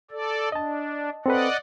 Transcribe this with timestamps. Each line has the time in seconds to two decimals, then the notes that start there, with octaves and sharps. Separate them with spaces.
0.11 A4 D5
0.52 D4 D#5 A5
1.26 C4 A4 B4 D5 D#5 F#5